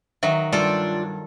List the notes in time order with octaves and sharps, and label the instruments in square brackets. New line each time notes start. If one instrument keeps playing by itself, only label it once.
[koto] D#3 F#3 [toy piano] E5
[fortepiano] G2 [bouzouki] D4 F4 G5 [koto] A4